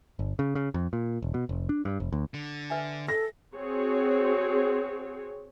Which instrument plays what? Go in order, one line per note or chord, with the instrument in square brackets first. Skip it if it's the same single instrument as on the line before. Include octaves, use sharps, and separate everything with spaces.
[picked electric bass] G1
C#3
C#3
F2
A#2
E1
B2
F1
D4
G2
F1
D2
[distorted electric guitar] D3
[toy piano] B4 E5 G#5
[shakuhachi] A4 [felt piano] A#6
[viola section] C4 F#4 G#4 C#5